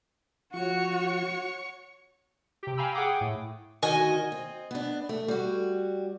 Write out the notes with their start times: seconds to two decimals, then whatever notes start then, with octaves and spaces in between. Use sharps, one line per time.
0.54 F3 F4 F#4 C#5 C#6
2.63 C3 G4
2.77 F5 G5 G#5 A#5 B5 E6
2.94 G#4 F#5 G5 D6 D#6
3.21 A2
3.83 D2 D#3 F#4 D#5 G#5
4.32 C4
4.71 B3 D4
5.09 A3
5.28 G3 F#4